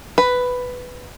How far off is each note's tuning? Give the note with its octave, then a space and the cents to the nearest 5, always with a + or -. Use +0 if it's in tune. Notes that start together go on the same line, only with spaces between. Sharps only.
B4 +5